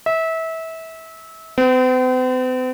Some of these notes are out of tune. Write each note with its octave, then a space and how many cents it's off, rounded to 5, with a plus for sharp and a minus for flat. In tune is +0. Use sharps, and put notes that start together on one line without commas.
E5 -25
C4 -45